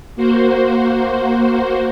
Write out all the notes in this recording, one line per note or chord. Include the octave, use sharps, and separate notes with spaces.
A#3 F#4 C5